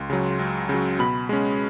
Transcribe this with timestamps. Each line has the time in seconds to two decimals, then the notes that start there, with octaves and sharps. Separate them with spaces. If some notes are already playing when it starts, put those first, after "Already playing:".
Already playing: C#2 C6
0.10 C#3 F#3
0.39 C#2
0.69 C#3 F#3
0.99 B2 B5
1.29 G#3 C#4